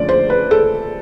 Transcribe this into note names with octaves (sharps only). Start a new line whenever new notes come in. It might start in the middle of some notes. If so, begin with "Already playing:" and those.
Already playing: D3 F3 A3 C#4 D5
C5
B4
A4